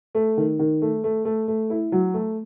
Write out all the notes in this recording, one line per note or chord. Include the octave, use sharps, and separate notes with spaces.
A3
D#3
D#3
A3
A3
A3
A3
E4
F#3
A3